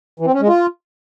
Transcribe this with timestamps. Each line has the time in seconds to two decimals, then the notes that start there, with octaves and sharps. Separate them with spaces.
0.20 E3
0.27 C4
0.34 C#4
0.41 G#3
0.48 F4